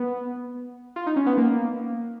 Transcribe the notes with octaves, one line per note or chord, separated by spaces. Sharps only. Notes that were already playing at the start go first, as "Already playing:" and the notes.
Already playing: B3
F4
D#4
C#4
B3
A#3